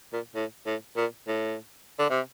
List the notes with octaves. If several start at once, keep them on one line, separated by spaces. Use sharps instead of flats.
A#2
A2
A2
A#2
A2
D3
C3